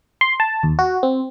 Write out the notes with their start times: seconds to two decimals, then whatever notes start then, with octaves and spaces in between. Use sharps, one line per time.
0.21 C6
0.40 A5
0.63 D#2
0.79 F#4
1.03 C4